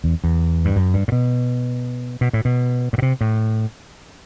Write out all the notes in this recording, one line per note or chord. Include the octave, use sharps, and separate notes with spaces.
E2
E2
G2
F#2
G2
A2
B2
B2
A2
B2
A2
B2
C3
A2